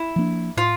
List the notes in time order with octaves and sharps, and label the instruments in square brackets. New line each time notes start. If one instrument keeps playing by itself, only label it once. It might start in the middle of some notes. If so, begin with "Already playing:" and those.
Already playing: [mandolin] E4
[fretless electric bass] F3 A#3 D4
[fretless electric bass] A2 [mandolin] F4